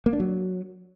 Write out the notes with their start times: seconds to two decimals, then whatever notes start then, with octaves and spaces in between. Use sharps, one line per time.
0.06 A#3
0.13 D4
0.20 F#3